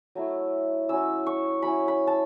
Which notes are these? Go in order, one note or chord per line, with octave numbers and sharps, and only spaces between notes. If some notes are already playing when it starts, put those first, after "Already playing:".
F#3 A3 E4
F#3 C#4 E4 E6
C#6
F#3 C#4 E4 B5
B5
A5